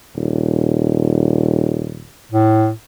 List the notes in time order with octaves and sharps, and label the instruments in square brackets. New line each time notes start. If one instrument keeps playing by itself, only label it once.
[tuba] D#1
[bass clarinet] A2